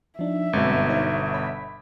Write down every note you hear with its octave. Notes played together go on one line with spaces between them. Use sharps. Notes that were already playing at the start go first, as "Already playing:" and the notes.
F3 D4 D#4 E5
G1 F#2 B2 G#3 C4
D#4 C5 C#5
C#5 B5 B6